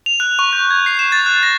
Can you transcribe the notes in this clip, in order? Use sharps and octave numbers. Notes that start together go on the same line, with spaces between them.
F7
F#6
C#6
G6
G#6
C7
E7
A6
F#6
A#6